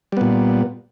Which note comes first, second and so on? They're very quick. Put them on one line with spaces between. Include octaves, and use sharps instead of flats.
G3 B3 A#2